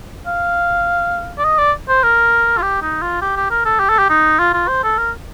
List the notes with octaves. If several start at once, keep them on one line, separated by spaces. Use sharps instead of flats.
F5
D5
D#5
D5
C5
A#4
F4
G4
D#4
F4
G4
G4
A#4
A4
G4
A4
G4
D#4
F4
F4
C5
A4
A#4